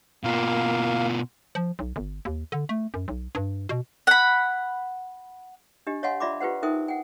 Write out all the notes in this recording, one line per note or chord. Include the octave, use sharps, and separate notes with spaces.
B2 A#3 F4 F5
F3
B1
G1
D#2
D3
A3
F#2
B1
G2
B2
F#5 B5
D4 G4 D#5
C#5 D#5 F5 F#5 G#5 C6
F4 D5 E5 B5 C6 D6
F4 G4 B4 C5 F#5
D#4 A#4 C5 E5 G5 D#6
F#5 G5